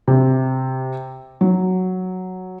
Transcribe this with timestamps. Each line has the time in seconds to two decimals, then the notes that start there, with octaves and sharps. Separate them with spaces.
0.08 C3
1.41 F#3